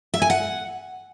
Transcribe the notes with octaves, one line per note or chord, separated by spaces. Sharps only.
E5
G#5
F#5